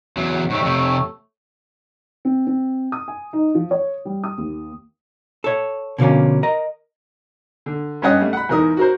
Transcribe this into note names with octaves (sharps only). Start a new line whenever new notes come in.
E2 F#3
G#2 G3 A3 C#5
F2 C3
C4
C4
D#6
G#5
D#4
F3
C#5
G3
D#6
D#2
A4 C#5
B2 D3 F3 A#3 C#4
A#4 D#5 A#5
D3
G2 C#4 C#5 D#5 F#5 D#6
G3 A3
F#5 B5
E2 G#2 A#4 D#6
F#4 A#4 C5